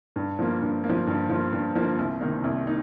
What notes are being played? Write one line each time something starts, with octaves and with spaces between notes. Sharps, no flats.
G2
F3 A#3
G2
A#3
F3
G2
F3 A#3
G2
F3 A#3
C2
C3 D#3 A#3 D#4
C2
A#3 D#4